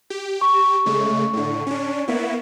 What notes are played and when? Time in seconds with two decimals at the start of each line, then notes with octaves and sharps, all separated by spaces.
0.10 G4
0.41 C#6
0.86 C#3 G#3 A3
1.33 A2 D3
1.67 C#4 D4
2.08 A#3 B3 E4